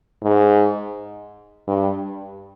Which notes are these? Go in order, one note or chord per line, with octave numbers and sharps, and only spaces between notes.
G#2
G2